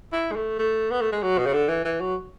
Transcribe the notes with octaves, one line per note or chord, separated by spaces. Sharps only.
E4
G#3
A3
A3
B3
A3
G#3
F#3
B2
C#3
D3
E3
E3
F#3